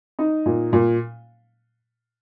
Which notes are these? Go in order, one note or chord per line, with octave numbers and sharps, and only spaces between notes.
D#4
A#2
A#2